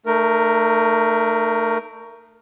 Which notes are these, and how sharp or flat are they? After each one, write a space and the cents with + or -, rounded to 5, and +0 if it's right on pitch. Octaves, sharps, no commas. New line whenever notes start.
A3 +25 D#4 -30 A#4 +0